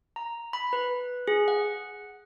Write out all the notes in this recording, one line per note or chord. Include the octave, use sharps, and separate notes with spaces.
A#5
B5
B4
G#4
F#5